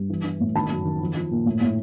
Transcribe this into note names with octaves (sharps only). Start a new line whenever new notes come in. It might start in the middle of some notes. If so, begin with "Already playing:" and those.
Already playing: G2
E3
E3
A2
D#3 A5 B5
F#2
D#3
F3
F3
A#2
A2
A2